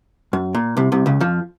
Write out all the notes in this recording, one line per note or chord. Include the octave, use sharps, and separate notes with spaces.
F#2
A#2
C2 C3
C2 C3
C#2 C#3
F2 F3